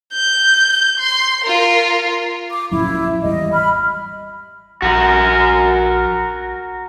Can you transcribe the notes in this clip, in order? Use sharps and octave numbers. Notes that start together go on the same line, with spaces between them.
G6
C6
F4 A#4
D6
D1 A#1 F#2 E4
G#1 E2 G3 D#5
B5 F6
A#1 F#4 A#4